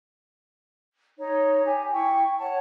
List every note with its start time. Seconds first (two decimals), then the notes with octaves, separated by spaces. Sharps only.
1.18 D#4 C#5
1.65 G4 G#5
1.92 E4 G5 C#6
2.39 C#5 F#5 A5